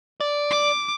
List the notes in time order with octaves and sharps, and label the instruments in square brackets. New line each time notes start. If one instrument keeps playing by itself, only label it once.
[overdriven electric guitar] D5
[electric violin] D6